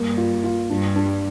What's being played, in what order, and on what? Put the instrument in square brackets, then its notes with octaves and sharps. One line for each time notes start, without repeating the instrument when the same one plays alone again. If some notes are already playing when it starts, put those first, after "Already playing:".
Already playing: [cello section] G2 [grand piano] A#3
[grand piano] F4
F4
[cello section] G2 [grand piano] D4
[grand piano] D4